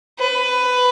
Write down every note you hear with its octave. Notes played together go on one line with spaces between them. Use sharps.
B4